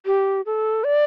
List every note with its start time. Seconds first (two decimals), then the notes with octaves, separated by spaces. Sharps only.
0.06 G4
0.46 A4
0.84 D5